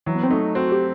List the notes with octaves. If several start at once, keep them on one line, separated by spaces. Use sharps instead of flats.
E3 F#3
B3
C4
A3 D#4
C4 F#4
G4